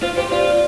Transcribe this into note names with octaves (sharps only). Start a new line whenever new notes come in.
F4 C5
G4 C5
F4 D5